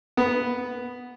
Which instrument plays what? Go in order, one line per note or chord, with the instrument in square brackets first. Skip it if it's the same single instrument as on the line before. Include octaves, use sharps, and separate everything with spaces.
[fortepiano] B3